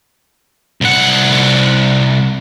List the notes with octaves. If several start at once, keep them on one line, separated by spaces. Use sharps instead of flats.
C2 F#5